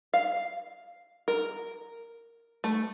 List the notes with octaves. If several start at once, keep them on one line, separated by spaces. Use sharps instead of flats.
F5
A#4
A3